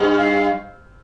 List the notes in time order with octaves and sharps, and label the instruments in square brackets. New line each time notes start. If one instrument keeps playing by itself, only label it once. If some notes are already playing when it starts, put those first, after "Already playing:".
Already playing: [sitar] G2
[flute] F5